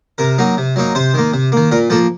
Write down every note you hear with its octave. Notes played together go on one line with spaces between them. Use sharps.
C3 A#4
F#3 A#3 D#4
C3
F#3 A#3 D#4
C3 C5
D#3 A#3
C3
D#3 A#3
A#2 A#4
F3 A#3 A4